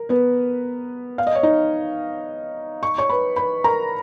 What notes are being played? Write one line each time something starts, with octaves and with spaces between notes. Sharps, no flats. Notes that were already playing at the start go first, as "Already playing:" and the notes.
Already playing: A#4
B3 B4
F5
D#5
C#5
D#4 D#5
C#6
C#5 C#6
B4 B5
B4 B5
A#4 A#5